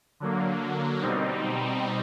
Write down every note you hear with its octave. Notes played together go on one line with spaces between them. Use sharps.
D3 F#3 A#3
B2 G3 C4 D#4